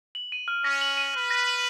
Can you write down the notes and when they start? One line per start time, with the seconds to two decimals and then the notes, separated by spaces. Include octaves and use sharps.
0.15 F#7
0.32 D#7
0.48 F6
0.64 C#4 A#6
0.81 F#7
0.97 D#7
1.13 B4 F6
1.31 A#6
1.48 F#7